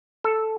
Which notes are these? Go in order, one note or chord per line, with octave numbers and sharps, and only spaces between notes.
A4